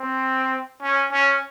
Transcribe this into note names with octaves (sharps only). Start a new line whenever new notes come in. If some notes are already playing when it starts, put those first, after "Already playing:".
Already playing: C4
C#4
C#4